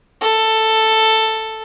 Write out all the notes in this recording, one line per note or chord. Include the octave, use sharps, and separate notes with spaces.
A4